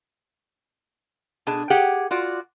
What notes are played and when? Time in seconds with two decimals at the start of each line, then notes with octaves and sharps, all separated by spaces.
1.47 B2 D4 G#4 A5
1.70 G4 G#4 F#5 G5
2.11 F4 F#4 D5